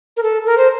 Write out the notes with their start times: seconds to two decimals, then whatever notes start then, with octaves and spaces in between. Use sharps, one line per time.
0.17 A#4
0.23 A4
0.46 A#4
0.58 C5